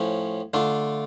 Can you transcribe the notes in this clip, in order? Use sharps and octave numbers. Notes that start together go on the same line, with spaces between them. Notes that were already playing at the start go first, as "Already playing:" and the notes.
Already playing: A2 F3 C#4
D3 A3 D4 F4